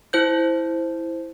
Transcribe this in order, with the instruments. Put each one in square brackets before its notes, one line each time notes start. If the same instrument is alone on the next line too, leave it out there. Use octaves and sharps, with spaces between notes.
[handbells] E4 C5 G6